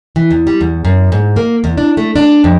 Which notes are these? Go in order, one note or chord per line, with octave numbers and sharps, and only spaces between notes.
E3
E2
G3
E2
F#2
G#2
A#3
E2
D4
A3
D4
F2